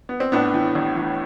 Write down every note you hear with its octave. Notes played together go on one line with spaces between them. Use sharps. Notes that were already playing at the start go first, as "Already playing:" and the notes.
B3
C4
A2 B3 D4
E3
A1
E3